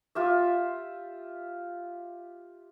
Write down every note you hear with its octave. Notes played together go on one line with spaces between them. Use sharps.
F4 G4 E5